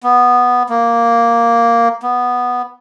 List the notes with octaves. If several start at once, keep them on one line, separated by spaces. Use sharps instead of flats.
B3
A#3
B3